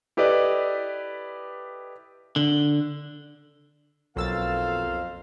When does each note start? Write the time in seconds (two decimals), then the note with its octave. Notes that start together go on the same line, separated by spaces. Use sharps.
0.17 E4 G4 A4 B4 D5 D#5
2.36 D3
4.16 B1 F2 A#3 C5 F5 E6 A6